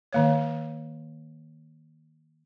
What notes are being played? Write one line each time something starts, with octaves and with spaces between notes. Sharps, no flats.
D#3 A#3 C#5